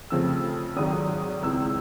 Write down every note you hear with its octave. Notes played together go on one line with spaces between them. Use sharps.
F2 C#3 F3 A3 C4 E6
G#1 G#2 D#3 F#3 D#6
C#2 C3 E3 G#3 E6